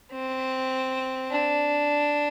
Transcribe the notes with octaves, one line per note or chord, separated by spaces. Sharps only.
C4
D4